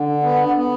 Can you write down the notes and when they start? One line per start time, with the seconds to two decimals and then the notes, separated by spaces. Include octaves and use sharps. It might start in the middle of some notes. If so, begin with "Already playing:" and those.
Already playing: D3
0.23 B3
0.57 B3